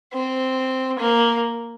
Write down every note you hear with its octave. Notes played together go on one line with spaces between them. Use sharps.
C4
A#3